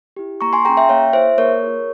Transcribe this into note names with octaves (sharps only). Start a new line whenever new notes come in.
E4 G4
A#3 A#5 C#6
G#5 C6
C#4 F4 G#4 G5 A#5
E5 G5
A#3 C#5 F5
E4 G#4 C5 E5
A#3 A#4 C#5
F4 G#4